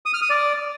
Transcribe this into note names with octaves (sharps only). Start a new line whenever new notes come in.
D#6
F6
D#6
D5